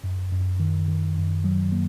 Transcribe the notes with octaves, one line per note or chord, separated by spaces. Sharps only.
F#2
F#2
D#3
D#3
F#2
F#3
A#3